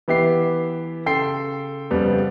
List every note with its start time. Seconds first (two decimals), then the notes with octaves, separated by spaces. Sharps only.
0.08 E3 B3 G4 E5 C7
1.06 C#3 A4 G5 C6 C7
1.91 F2 C#3 G3 B3